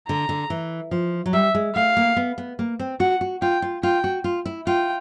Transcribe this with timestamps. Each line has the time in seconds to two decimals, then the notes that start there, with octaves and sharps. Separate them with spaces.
0.08 D3 A#5
0.29 D3
0.50 E3
0.91 F3
1.26 F#3
1.33 G3 E5
1.54 G#3
1.75 A3 F5
1.97 A#3
2.16 B3
2.38 B3
2.59 A#3
2.79 C4
3.00 F#4 F#5
3.21 F#4
3.42 F4 G5
3.62 F4
3.83 F4 G5
4.04 F#4
4.24 F4
4.46 E4
4.67 F4 G5